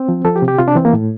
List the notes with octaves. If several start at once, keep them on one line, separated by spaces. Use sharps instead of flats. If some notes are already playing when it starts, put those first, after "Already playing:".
Already playing: C4
F3
F3 A4
G4
C3
G4
C3 F4
D4
E3 C4
A#3
A2